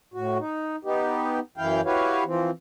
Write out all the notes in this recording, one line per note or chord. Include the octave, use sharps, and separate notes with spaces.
A2 F#4
D#4
B3 D#4 G4
F#2 E3 E4 F5 G5
E4 F#4 G4 B4 C#5 F5
E3 F3 C4